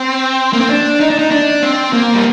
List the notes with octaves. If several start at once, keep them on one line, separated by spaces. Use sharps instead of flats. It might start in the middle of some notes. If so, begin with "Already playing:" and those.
Already playing: C4
A#3
C4
D4
D#4
D4
D#4
D4
C4
A#3
G3